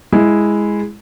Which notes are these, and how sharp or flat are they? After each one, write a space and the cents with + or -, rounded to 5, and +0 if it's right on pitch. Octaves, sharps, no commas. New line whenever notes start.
G#3 +0 E4 +0